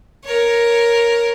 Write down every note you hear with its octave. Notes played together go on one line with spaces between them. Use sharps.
A#4 C#5